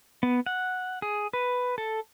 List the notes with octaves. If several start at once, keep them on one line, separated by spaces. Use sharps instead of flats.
B3
F#5
G#4
B4
A4